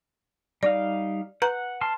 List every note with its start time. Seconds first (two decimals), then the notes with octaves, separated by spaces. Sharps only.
0.63 G3 D#4 D5 F5
1.42 B4 F#5 A#5 F#6
1.81 A5 C6 F6